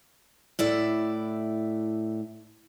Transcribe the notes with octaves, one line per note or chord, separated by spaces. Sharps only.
A2 E4 D5